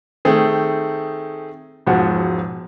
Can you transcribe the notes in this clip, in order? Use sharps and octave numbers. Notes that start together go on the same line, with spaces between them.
D#3 A3 C4 G#4
E1 G#2 F3 F#4 F#5